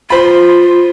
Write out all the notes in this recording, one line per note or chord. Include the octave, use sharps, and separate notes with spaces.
F4 C5 B5